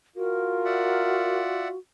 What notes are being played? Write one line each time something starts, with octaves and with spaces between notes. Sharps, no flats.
F4 F#4 A#4
D5 E5 F#5